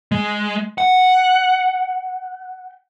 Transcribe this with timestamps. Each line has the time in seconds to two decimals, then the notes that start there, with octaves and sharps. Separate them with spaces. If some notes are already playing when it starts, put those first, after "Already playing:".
0.12 G#3
0.78 F#5